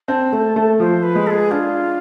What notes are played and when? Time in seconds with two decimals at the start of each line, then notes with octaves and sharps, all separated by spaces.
0.08 C4 A5
0.32 A3
0.56 A3
0.80 F3 C5
1.03 B4
1.15 G#3
1.27 A4
1.31 G#4
1.51 D4 F4